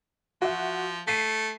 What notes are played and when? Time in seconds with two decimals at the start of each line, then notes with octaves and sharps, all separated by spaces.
0.42 F3 F#4 E5
1.08 A3 B6 C7 D#7